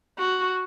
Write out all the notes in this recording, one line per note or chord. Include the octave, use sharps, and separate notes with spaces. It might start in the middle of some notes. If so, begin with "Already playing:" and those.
F#4